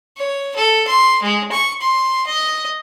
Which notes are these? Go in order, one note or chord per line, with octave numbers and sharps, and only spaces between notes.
C#5
A4
C6
G#3
C#6
C6
D#5